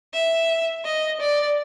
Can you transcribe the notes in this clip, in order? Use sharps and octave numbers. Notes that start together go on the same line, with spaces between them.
E5
D#5
D5